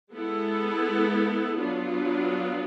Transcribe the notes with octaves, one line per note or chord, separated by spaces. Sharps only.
G#3 B3 E4 A4
F#3 B3 D4 F4